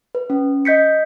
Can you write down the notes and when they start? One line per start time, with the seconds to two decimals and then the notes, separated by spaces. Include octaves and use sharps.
0.15 B4
0.30 C#4
0.65 D#5 G6 B6 C#7